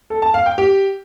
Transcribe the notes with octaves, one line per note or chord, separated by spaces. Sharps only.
A4
A5
F5
G5
G4